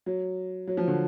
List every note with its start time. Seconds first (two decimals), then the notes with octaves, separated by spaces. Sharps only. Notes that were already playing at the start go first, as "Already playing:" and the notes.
0.06 F#3
0.67 F#3
0.77 F3
0.88 D3